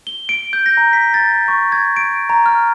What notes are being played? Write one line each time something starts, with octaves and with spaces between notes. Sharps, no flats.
G7
D7
G6
A#6
A#5
B6
A6
C#6
G#6
D7
A#5
F6